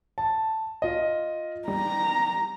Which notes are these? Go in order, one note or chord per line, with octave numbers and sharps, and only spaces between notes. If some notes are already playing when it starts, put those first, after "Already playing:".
A5
F4 D#5
G3 A#5